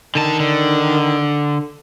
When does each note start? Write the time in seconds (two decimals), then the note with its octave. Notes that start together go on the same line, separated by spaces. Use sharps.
0.15 D3 D#3 A5
0.40 D3